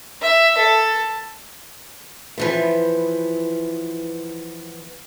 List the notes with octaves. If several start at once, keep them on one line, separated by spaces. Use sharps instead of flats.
E5
A4
E3 F3 B3